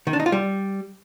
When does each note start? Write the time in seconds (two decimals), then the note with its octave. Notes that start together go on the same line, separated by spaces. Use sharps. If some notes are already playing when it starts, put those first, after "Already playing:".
0.07 D#3
0.13 D4
0.20 D#4
0.26 F4
0.32 G3